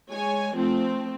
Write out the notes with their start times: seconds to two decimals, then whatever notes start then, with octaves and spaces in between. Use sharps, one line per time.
0.10 G#3 C#5 G#5
0.54 F3 A3 C4